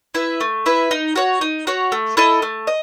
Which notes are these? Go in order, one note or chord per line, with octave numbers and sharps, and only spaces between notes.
E4 B4 E5
A3
E4 B4 E5
D#4
F#4 C#5
D#4
F#4 C#5
A3
E4 A4 D#5
A3
D#5